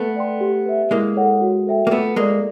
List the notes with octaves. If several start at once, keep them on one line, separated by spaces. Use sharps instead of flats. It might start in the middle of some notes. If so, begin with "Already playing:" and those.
Already playing: A3 B3 A4
D5 G5 C6
G4
B4 E5
G#3 A#3 E4
A4 C#5 F#5
F#4
A4 C5 E5 G5
A#3
A3 B3 F4
G#3 A#3 A4 D5